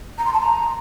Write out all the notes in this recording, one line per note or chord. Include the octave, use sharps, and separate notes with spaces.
A#5
C6
A5
A#5